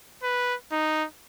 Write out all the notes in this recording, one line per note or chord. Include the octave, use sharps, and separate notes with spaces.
B4
D#4